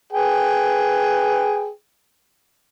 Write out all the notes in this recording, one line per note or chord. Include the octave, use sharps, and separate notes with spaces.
G#4 B4 G5